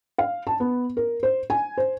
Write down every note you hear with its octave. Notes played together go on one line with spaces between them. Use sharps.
F5
A5
B3
A#4
C5
G#5
C5